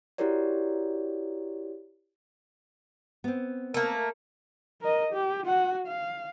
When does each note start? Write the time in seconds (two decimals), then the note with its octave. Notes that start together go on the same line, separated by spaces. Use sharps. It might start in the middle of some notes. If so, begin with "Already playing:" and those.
0.18 E4 F#4 G4 A#4 C#5 D5
3.24 B3 C4
3.74 A3 A#3 A#4
4.81 A#4 D#5
5.13 G4
5.46 F#4 F#5
5.87 F5